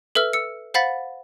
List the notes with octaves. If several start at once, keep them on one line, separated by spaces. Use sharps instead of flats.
A4 B4 E5 E6 F6
E6 C#7
C5 F5 F#5 B5 A6 B6